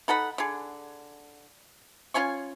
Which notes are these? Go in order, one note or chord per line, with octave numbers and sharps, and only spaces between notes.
D#4 A4 F#5 B5
D3 G#4
C#4 F4 G#5 C#6